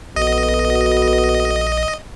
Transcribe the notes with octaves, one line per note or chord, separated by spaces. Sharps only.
A#1 B3 F#4 A4 D#5